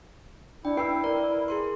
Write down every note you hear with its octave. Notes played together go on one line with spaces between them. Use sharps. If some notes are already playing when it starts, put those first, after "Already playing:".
D4 E4 G5
B4 G5 E6 C7
A#4 D5
G#4 A#4 C6